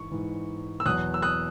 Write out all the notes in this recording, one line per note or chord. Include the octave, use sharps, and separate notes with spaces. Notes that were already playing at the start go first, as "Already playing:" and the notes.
Already playing: G#2 E3 C#6
G#2 E3
E6
E2 B2 F#3 D#6 F#6
E6
D#6 F#6